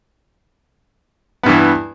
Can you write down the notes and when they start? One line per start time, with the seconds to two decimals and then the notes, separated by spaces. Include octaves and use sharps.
1.43 B3
1.46 G2
1.49 E3